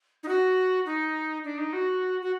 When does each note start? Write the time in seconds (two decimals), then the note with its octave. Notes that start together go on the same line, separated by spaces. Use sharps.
0.23 D#4
0.28 F#4
0.86 D#4
1.44 D4
1.58 D#4
1.73 F#4
2.22 F#4